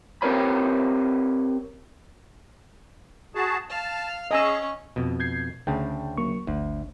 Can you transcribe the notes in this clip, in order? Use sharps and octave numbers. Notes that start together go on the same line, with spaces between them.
C4 G4 A#4 B4 C#5 B5
F#4 G#4 A5
F5 A5
C#4 G#4 D#5 G#5 C#6 E6
F2 B2
G6 G#6 C7
D2 C#3 G#4 G5 A5
F#3 A#3 C#6
G1 D2